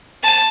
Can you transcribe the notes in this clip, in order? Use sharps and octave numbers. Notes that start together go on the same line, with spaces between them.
A5